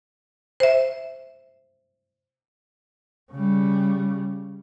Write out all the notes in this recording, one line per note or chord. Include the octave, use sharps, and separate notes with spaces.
C5 E5
C#3 G3